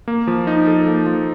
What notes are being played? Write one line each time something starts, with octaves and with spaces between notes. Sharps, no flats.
A#3
F3
D#4
A4
A#3
F3